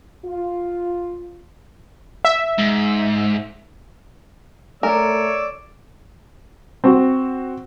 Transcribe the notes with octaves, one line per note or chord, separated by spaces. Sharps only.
F4
E5
G#2
A3 A#4 C#5 D5 E6
C4 F#4